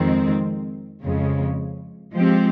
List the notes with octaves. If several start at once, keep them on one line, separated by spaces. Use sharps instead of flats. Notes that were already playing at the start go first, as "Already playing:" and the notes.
Already playing: F2 D#3 G#3 C4
F2 C#3 G#3
F3 G#3 C4 G4